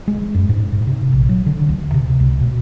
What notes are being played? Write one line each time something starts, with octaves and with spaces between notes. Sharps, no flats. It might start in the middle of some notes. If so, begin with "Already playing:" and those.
G#3
F#2
G#2
G#2
C3
A#1
F#3
D3
D2
C3
C#2
B2